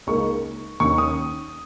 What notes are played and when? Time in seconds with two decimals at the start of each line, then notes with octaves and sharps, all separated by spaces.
0.07 C#2 C#3 A#3 D#4 C#6
0.80 D#2 D#3 C#4 C#6
0.98 D#6